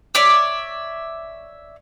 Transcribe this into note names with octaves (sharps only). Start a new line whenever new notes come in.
C#5 D5 E5